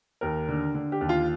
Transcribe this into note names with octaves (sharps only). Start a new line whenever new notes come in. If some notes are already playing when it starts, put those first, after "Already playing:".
D#2 A#4
D3
D3
G4
D#2
F4